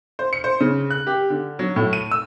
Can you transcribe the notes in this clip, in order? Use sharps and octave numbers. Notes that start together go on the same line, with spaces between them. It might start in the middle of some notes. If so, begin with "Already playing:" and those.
C5
C#7
C5
C#3
F#6
G4
D3
F#3
A2
D#7
E6